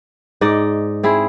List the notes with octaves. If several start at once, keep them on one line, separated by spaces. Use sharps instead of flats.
G#2 D#4 D5 D#5
C4 E4 G#4